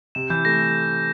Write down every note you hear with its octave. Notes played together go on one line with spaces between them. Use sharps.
C3 E7
E3 G6
A3 A#6